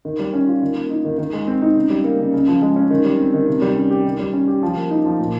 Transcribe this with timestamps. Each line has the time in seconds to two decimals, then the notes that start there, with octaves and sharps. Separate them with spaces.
0.05 D#3
0.19 G3
0.33 C#4
0.47 F4
0.62 D#3
0.75 A#3
0.90 D#4
1.05 D#3
1.18 D#3
1.33 G#3
1.47 C4
1.62 D#4
1.76 C#3
1.90 G3
2.04 A#3
2.18 C#3
2.34 C#3
2.48 F3
2.62 G#3
2.76 C#4
2.90 D#3
3.05 G3
3.19 C4
3.34 D#3
3.47 C3
3.62 G3
3.76 C#4
3.91 G4
4.04 D#3
4.19 G3
4.33 C#4
4.48 G4
4.63 F3
4.77 A#3
4.91 D#4
5.05 F3
5.20 A#2